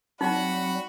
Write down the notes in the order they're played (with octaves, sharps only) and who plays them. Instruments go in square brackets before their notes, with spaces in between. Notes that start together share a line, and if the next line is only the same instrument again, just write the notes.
[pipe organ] F#3 G3 C4 [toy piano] D#4 [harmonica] F#4 B5 [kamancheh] F#5